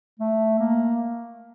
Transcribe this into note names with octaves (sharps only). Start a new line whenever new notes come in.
A3
A#3